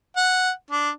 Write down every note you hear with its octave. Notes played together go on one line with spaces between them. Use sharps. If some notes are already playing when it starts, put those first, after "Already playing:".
F#5
D4